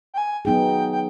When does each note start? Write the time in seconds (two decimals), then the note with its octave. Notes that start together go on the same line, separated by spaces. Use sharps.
0.14 G5
0.18 G#5
0.45 F#3 B3 D#4 G#4 G5
0.92 G5